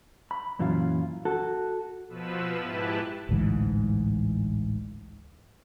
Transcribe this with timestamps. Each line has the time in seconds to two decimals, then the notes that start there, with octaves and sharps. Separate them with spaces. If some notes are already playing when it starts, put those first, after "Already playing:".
0.31 B5
0.59 F#2 A#2 E3 F#3 C#4 F4
1.25 F#4 A4
2.09 B2 F3 B4 E6
2.60 G#2 E4 G4 B4 A5 F#6
3.29 A1 D2 G#2 E3